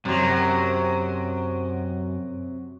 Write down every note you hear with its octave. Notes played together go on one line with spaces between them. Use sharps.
F#2 C3 F#3